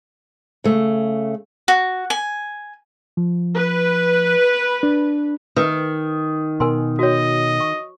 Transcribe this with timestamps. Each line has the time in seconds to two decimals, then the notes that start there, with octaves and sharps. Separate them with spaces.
0.64 C#3 A3
1.68 F#4
2.10 G#5
3.17 F3
3.55 B4
4.83 D4
5.56 D#3 A#4 B4
6.60 B2 A#4 G#5 C6
6.99 F#4 C#5 D#5
7.60 C#6